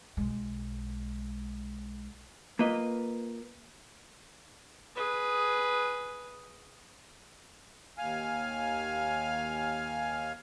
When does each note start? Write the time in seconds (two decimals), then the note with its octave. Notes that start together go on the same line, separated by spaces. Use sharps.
0.17 B1 G#3
2.59 A#3 F4 B4 D#5
4.95 G#4 B4
7.98 D#2 F5 G#5 F6